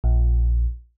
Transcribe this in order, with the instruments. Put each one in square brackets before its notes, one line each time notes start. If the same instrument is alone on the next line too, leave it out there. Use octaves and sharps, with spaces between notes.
[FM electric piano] A#1